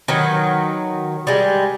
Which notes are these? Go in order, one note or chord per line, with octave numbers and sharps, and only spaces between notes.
D#3 F#3 B4
G3 G#3